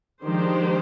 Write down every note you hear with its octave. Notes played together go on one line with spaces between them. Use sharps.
D#3 F3 G#3 D4 G4 C5